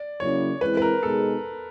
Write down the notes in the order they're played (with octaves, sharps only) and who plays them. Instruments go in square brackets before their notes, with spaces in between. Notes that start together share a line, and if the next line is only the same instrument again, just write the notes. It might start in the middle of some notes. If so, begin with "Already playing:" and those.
Already playing: [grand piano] D5
[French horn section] C#3 F#3 A#3 C#4 E4 [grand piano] C#5
[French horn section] E3 G#3 C4 E4 [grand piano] B4
[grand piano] B4
A#4
[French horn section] B2 G#3 B3 D#4 G#4 [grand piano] A4